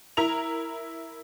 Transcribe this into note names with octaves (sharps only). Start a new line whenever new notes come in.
E4 A#4 A#5 F7